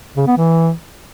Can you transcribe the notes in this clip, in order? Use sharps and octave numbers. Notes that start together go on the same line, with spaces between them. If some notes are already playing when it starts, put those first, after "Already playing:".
C#3
B3
E3